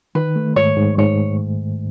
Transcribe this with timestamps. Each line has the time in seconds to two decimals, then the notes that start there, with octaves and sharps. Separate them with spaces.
0.15 D#3 B4
0.36 A3
0.56 G#2 C#5
0.77 G#2
0.98 G#2 C#5